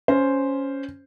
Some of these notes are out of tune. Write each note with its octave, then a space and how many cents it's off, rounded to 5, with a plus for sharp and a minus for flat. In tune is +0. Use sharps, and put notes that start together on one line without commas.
C#4 +5 C5 +0